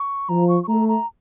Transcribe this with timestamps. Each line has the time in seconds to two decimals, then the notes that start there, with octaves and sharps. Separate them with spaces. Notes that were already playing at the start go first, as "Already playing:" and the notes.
Already playing: C#6
0.29 F3 A#5
0.49 C#6
0.63 C#6
0.68 A3 A#5
0.88 A#5